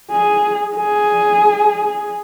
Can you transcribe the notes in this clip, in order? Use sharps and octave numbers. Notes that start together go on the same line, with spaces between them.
G#4
G#4